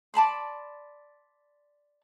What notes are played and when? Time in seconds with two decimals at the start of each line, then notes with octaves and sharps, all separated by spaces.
0.14 D5 A5 B5 C6